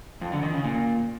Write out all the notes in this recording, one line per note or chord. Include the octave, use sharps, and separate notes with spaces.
F2
D3
D#3
C#3
A#2